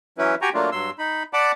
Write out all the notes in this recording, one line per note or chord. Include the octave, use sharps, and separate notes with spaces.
E3 F#3 C#4 E4 B4
F#4 G4 G5 G#5 A#5 C#6
F#3 A3 A#3 D4 F4
G2 F#3 C6 E6
D#4 B5
D5 F#5 A5 B5 D6